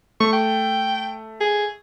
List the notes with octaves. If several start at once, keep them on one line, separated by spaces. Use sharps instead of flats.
A3 C#6
G5
G#4